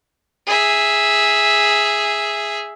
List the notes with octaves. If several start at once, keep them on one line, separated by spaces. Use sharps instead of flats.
G#4 E5